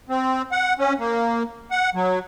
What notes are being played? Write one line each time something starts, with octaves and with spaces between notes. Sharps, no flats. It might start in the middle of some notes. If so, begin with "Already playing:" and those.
C4
F#5
C#4
A#3
F#5
F#3